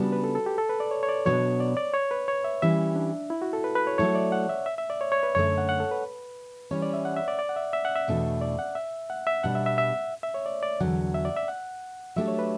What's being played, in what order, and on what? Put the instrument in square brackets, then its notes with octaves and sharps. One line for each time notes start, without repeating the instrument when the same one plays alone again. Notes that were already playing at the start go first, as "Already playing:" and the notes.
Already playing: [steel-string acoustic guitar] C#3 G3 B3 D4 [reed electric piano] F#4
[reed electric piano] B4
A4
A4
G4
A4
B4
D5
C#5
C#5
D5
[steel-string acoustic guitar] B2 F#3 B3 D4 F#4 [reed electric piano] C#5
[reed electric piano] D5
D5
C#5
B4
C#5
E5
[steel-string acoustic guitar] E3 G3 C#4 G4 [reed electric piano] E5
[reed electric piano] D4
E4
F#4
A4
B4
B4
C#5
[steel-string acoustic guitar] F#3 A3 E4 A4 [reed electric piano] C#5
[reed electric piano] D5
F#5
E5
E5
E5
D5
C#5
C#5
B4
[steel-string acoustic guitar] F#2 D3 A3 [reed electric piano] C#5
[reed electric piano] F#5
F#5
A4
B4
[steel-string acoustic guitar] E3 G3 C#4 [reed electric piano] C#5
[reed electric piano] D5
E5
F#5
E5
D5
D5
F#5
E5
E5
F#5
E5
[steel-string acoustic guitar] E2 B2 A3 D4 F#4
[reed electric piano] D5
F#5
E5
F#5
E5
[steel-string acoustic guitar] B2 G3 D4 [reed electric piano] F#5
[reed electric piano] E5
E5
E5
E5
C#5
D5
D5
[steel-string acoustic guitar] E2 D3 F#3 [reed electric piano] F#5
[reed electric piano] E5
D5
E5
F#5
[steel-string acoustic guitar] F#3 A3 D4 G4 [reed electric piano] E5
[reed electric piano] C#5
B4